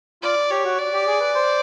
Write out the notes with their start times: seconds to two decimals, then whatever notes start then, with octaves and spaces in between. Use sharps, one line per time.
0.22 F4 D5
0.51 G4 C#5
0.65 F#4
0.79 D5
0.93 G4
1.07 G#4
1.20 B4
1.35 C5